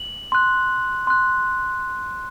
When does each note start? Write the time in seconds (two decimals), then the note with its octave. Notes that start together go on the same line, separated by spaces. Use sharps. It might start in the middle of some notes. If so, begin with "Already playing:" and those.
Already playing: F#7
0.32 C6 F#6
1.07 C6 F#6